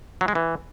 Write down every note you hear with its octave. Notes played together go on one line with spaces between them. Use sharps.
F#3
G#3
E3